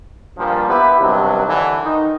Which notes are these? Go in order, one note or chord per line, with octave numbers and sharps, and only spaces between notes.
G2 A#2 F3 G3
B3 E4 G4 B4
G2 C3 D#3 F#3
D3 E3
D#3 D#4